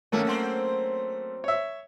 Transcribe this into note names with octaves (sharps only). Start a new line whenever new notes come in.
D#3 F#3 A3 A#3 C#4 F#4
F#3 C4 C5
C#5 E5